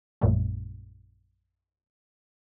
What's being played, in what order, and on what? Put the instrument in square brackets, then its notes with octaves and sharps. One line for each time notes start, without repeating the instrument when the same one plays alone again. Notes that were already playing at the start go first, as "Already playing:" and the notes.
[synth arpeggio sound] A#1 F#2 A#2 G3 A3